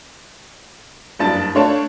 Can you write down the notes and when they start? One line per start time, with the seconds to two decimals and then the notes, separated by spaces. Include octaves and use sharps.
1.19 F#1 G2 D4 A5 A6
1.55 A3 D4 C#5 F5 A5